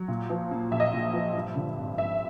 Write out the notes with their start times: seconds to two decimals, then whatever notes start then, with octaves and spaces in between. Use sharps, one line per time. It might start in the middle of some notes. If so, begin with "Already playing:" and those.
Already playing: F#3
0.08 A#2
0.30 F3
0.51 A#3
0.71 A#1 E5
0.80 D#5
0.88 E5
0.93 A#2
1.13 F3
1.35 G2
1.55 D3
1.77 G#1
1.98 G#1 E5